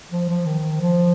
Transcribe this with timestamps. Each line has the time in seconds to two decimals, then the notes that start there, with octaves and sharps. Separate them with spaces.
0.11 F3
0.29 F3
0.46 D#3
0.81 F3